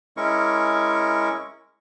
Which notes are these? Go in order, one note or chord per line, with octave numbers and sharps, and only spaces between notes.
G#3 C#4 E4 A#4 C#6